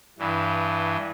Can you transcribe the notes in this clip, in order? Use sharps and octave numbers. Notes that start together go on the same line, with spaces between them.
G2 E3